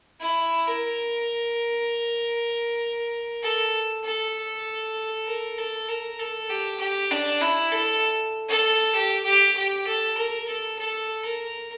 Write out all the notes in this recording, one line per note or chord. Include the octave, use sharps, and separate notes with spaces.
E4
A#4
A4
A4
A#4
A4
A#4
A4
G4
G4
D4
E4
A4
A4
G4
G4
G4
A4
A#4
A4
A4
A#4